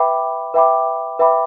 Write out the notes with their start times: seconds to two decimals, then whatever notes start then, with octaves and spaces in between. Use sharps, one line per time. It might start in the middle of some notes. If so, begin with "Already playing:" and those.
Already playing: B4 E5 G5 B5 D6
0.54 B4 E5 G5 B5 D6
1.19 B4 E5 G5 B5 D6